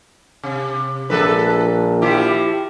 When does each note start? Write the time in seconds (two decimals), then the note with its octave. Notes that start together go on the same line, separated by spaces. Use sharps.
0.43 C3
1.10 A#1 G#3 A4 B4
2.02 F3 E4 G4